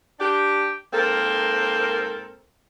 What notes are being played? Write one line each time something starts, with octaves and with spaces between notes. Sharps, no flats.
D4 G4
G#2 A#3 C4 A4 A#4